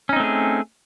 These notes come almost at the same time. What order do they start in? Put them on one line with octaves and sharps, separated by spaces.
C#4 D#4 C4 A3 G#4